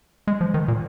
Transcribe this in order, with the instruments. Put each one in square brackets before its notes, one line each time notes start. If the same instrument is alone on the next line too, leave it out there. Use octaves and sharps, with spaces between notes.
[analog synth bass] G#3
F3
D#3
A#2